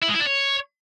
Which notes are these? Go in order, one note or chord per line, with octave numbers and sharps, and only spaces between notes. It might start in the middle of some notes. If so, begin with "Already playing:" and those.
E4
G#3
E4
D4
C#5